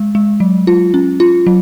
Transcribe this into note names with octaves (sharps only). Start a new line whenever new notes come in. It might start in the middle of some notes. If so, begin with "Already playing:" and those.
Already playing: G#3
G#3
F#3
F4
C#4
F4
F#3